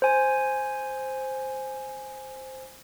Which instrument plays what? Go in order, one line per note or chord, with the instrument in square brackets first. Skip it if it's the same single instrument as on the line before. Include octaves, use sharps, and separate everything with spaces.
[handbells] C5 G#5